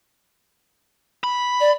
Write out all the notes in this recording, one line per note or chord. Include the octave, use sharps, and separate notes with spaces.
B5
D5